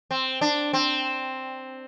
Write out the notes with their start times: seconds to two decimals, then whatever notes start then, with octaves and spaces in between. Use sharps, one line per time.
0.11 C4
0.41 D4
0.73 C4